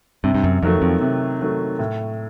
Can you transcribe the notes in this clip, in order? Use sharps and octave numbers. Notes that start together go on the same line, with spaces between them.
G2 C3
G2
F#2
F2 D#3 F#3 A3
F2
C3
D#3 F#3 A3
A2